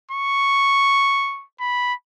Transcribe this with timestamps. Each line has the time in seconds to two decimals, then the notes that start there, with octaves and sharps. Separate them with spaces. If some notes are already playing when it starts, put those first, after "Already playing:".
0.11 C#6
1.60 B5